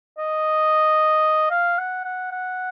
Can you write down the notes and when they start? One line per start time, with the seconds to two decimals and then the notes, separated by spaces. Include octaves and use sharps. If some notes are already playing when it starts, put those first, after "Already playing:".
0.18 D#5
1.50 F5
1.78 F#5
2.04 F#5
2.31 F#5